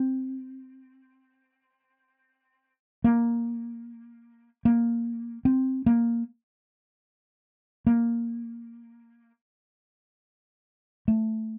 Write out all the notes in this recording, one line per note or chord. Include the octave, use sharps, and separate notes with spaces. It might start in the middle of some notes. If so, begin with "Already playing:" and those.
Already playing: C4
A#3
A#3
C4
A#3
A#3
A3